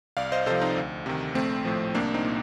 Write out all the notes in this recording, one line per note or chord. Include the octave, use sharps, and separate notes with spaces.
C2 D5 F5
C5 D#5
C3 F3 A4 C5
C4 D#4
D2
C3 D#3
A#1 A3 C4
A2 F3
C2 A#3 D4
C4 D#4
A#2